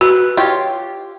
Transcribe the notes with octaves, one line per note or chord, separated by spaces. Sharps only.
F#4 B4
F4 G4 C#5